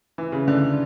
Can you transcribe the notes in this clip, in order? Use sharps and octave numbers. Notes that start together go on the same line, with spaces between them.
E3
C#3
D3